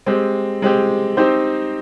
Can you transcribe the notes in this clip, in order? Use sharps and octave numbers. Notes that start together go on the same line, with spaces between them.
G#3 C4 G4
G#3 C4 G4
C4 D#4 G4 C5